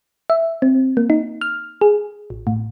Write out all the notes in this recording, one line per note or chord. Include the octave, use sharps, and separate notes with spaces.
E5
C4
A#3
D#4
F6
G#4
A1
A2